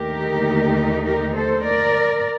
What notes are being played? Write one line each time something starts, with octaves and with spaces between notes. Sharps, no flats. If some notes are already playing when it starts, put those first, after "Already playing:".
Already playing: D#2 D3 A3 D#4 G4 A#4
G4 A#4
A4 C5
A#4 D5